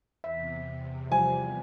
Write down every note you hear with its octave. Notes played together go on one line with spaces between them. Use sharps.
E2 C3 E5
F3 G3 G#5